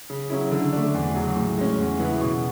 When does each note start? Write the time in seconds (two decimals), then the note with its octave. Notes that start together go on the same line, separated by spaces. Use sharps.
0.10 C#3
0.30 F#3 C#4 E4
0.51 D3
0.73 A3 D4
0.94 E2
1.15 C#3 F#3
1.36 A2
1.58 G#3 C#4
1.78 E2
1.99 C#3 E3 B3 E4
2.21 B2